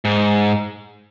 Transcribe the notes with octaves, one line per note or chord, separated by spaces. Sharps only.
G#2